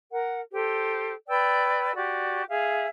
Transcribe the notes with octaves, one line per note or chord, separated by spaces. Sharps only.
A#4 F#5
G4 A4 C5
B4 D5 G5 E6
F#4 G4 D5
G#4 E5 F5